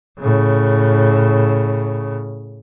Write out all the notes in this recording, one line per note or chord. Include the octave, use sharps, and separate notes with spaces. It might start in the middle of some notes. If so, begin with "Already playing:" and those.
A2 C#3